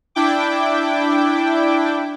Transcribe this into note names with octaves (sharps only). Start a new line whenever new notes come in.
D4 E4 G5 D6